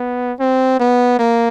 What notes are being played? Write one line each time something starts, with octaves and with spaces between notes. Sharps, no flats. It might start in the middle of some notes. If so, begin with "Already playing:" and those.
Already playing: B3
C4
B3
A#3